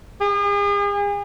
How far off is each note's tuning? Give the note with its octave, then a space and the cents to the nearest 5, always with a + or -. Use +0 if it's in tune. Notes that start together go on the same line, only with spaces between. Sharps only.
G#4 -40